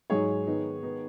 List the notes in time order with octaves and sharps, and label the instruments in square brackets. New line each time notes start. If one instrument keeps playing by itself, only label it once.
[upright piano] G#2 F#3 D#4 G#4 C#5
D#3 B3 D#4
D#3 B3 D#4